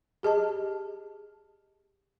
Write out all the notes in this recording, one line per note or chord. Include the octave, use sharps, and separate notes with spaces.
G4 G#4 D#5 A5